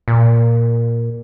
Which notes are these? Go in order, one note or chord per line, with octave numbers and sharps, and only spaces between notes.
A#2